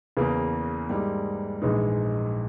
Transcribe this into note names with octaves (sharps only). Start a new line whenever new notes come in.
E2 C#3 E3 A#3
G#2 G3 A#3
A#1 G#2 E3 G#3 D#4